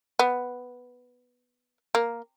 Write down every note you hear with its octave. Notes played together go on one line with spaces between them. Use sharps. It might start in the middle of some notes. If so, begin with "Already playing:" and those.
B3
A#3